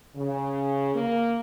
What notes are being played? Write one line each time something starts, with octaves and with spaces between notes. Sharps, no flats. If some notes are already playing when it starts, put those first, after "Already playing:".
C#3
A#3